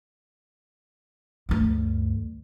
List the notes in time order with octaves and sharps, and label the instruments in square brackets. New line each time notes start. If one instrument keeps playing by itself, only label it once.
[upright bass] D2 G2